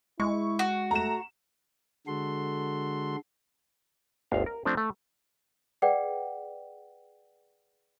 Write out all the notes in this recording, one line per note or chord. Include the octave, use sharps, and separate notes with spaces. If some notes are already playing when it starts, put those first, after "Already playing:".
G#3 E4 C#6
F#4
A3 A#5 E7
D3 G#3 F#4 A4 C6
G1 D2 F5
A#4
F3 A3 C4 D4
A3
G#4 B4 D5 F#5 G5